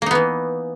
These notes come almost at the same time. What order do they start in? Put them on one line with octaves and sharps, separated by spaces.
A#3 D#4 B3 E3